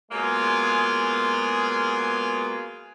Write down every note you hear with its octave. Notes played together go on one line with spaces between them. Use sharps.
F#3 G#3 A#3 B3 F4 G#4